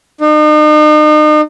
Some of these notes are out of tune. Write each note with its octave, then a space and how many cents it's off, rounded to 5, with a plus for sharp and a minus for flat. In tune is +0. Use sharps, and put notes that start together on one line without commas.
D#4 -40